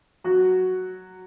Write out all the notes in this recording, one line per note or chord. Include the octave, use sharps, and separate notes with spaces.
F#3 F#4